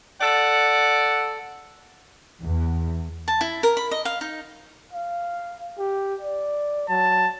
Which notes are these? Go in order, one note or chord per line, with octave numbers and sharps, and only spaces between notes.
A4 D5 F#5
E2
A5
E4
A#4
B5
D#5
F5
D#4
F5
G4
D5
F#3 A5